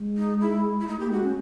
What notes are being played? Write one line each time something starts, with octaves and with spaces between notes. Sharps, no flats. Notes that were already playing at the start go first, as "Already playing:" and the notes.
Already playing: G#3
D#4
E4
E4
A3 D#4
A#3 G4
G#3 F#4
C#4